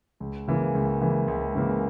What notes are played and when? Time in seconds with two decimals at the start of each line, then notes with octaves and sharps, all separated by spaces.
0.20 C#2
0.48 C#3 E3 A#3
0.75 C#2
1.01 C#3 E3 A#3
1.28 C#2
1.55 C#3 E3 A#3